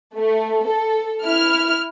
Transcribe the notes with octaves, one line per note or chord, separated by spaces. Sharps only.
A3
A4
E4 F6